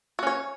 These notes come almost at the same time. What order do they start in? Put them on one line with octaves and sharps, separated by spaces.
F#4 C#4 C#5